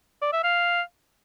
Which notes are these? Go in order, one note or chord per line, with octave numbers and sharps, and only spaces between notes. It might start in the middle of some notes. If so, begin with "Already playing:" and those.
D5
E5
F5